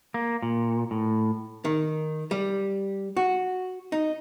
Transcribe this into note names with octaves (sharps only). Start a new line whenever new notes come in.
A#3
A#2
A2
D#3
G3
F#4
D#4